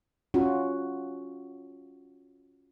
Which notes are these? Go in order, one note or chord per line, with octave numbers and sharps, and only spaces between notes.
C#4 F4 F#4